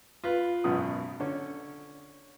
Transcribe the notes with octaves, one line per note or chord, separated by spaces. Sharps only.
F4 B4
G#1 F#2 B2 D#6
D3 C#4